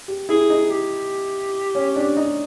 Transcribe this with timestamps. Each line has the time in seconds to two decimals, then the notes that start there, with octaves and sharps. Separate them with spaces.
0.08 G4
0.29 E4 G#4
0.50 D#4
0.70 G4
1.75 C#4
1.96 D4
2.17 D#4